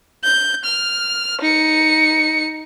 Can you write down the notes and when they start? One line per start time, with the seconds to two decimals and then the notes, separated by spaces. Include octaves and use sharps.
0.24 G6
0.65 F6
1.41 D#4 C#7